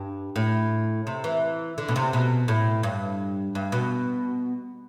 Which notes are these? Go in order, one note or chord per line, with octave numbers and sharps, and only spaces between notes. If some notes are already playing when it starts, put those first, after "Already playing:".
Already playing: G2
A2
C3
E3
D3
B2
C3
B2
A2
G2
G2
B2